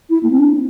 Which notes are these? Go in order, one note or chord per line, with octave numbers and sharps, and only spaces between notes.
E4
A#3
C4
D4